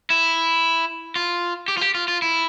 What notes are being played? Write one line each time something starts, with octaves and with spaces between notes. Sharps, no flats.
E4
F4
G4
F4
G4
F4
F4
E4